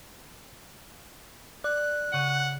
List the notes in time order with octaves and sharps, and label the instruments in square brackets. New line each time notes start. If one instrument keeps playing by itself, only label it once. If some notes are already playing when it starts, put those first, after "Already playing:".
[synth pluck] D5 [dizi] F#6
[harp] C#3 C#6 D#7 [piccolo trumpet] F#5